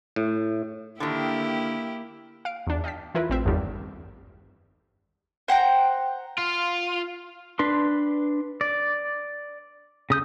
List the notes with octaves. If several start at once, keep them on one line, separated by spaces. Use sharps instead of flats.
A2
D3 D#3 A#3 E4 G4
F5 D7
E2 D4
D#5 F5 G5 A5 B6
E3 E4 F4 A#4 B4
A1 C4 E5
G1 E2 G2 D3 D#3 G3
C5 F#5 G5 A#5
F4
D4 B4 C6
D5
C#3 D#6 G6